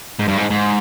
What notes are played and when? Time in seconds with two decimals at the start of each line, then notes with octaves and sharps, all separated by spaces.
0.19 G#2
0.28 G2
0.37 G#2
0.50 G#2